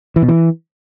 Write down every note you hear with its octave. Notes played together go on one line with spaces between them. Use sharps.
E3
B2
E3